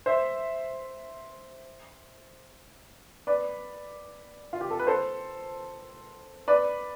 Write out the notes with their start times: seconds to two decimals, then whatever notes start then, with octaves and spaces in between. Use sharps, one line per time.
0.06 C5 E5
3.27 B4 D5
4.53 F4
4.61 G4
4.70 A4
4.79 B4
4.87 A4 C5
6.48 B4 D5